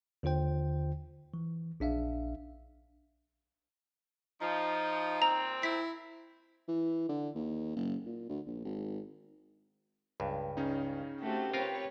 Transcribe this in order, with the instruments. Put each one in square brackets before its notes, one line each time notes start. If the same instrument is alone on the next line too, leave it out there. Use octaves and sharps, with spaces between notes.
[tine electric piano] D#2 D3 F4 C5 G5
E3
A#1 D4 E5 F5
[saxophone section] F3 [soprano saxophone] D#4
[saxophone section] A#2 C4 [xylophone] A#5
[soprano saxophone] E4 [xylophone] B6
[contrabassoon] E3
D3
D#2
F#1
A#2
D2
A#1
G#1
[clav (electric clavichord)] C#2 G2
[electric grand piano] C#3 C#4 D#4
[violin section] A3 C4 F#4 [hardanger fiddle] G4
[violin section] C4 B4 C#5 [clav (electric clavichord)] F4 A#4 F5